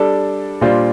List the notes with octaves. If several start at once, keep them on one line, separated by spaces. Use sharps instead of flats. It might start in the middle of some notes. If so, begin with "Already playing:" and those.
Already playing: G3 D4 A4
A#2 G3 D4 F4 C5